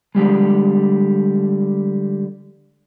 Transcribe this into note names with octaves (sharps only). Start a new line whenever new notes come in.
D3 F3 G3 G#3